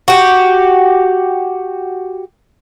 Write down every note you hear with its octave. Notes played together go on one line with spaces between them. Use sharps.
F#4 G4